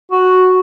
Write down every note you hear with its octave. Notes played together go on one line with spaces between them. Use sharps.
F#4